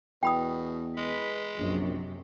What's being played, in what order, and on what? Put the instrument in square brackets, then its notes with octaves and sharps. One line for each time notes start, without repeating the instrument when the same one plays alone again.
[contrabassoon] E2 [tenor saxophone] B2 [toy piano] G5 B5 D#6
[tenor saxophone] G#3 [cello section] B4
[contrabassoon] A#1 [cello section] F#2 C3